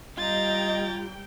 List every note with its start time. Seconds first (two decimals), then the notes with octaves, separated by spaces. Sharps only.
0.18 G3 F4 D#5 G5 A#5 A6